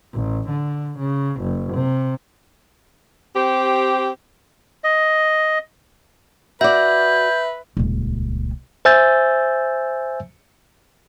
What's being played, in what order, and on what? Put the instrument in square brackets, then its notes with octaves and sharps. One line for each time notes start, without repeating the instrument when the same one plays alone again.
[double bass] A1
D3
C#3
F#1
C3
[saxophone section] C4 G4
[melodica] D#5
[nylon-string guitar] F#4 D5 [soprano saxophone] B4 [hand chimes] E5 [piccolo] G6
[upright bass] D#1 C#2
[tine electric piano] C5 E5 G#5 E6 G6 A6